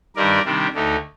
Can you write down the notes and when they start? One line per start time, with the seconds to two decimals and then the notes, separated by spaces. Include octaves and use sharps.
0.16 G2 D#3 G3 D4 A#4 D5
0.45 C3 D#3 G3 D4
0.74 D2 D3 A3 D#4